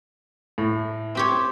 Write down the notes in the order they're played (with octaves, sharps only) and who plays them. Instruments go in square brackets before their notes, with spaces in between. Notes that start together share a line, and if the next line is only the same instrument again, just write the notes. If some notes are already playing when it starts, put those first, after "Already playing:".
[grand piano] A2
[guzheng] C4 G4 C#5